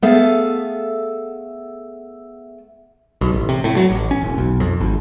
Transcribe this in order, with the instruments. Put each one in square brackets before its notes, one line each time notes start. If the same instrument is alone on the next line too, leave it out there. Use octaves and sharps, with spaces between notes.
[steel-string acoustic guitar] A3 B3 G#4 A4 E5 F5
[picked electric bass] B1
A1
C3
A2
F#3
A1
C#4
E1
B1
F2
G#1